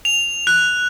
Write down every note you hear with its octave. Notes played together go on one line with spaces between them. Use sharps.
F7
F#6